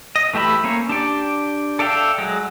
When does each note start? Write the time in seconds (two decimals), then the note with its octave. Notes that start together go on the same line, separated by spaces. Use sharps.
0.16 D#5
0.33 E3 A3 G4 E5 B5
0.64 A#3 C#4 C#5
0.89 D4 G4 D5
1.79 A4 D5 E5 F5 G5
2.18 F#3 G#3